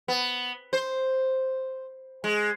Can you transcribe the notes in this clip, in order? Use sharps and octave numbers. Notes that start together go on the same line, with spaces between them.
B3
C5
G#3